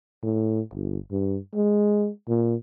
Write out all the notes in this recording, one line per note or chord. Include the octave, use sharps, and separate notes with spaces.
A2
G1
G2
G#3
A#2